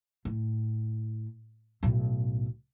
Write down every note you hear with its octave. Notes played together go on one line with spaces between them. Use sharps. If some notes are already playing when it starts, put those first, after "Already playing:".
A2
B1 A2